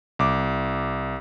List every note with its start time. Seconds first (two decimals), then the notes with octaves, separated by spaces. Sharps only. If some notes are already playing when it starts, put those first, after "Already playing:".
0.19 C2 D6